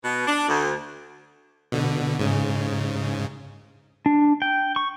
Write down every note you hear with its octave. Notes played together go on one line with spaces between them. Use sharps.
B2
D4
D2
B2 D3
G#2 C#3
D4
G5
C#6